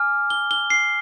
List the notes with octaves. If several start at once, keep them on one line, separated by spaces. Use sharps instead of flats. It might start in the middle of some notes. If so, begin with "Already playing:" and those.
Already playing: G#5 D6 F6
G7
G7
C7